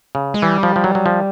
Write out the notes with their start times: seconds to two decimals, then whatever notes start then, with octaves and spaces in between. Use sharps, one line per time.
0.15 C#3
0.34 G#3
0.42 E3 G3
0.63 F3
0.76 F3
0.84 F#3
0.95 F#3
1.06 F3